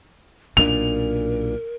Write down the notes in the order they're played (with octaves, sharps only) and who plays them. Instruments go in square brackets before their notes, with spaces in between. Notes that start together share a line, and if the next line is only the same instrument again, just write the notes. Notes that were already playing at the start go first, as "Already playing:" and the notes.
[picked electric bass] B1 A#2 [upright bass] D4 [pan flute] A#4 [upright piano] F7